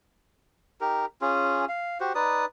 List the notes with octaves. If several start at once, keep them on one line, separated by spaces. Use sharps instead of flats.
D#4 G4 A#4
C#4 F4 G#4
F5
F#4 G4 C5
D#4 B4 D5 D#6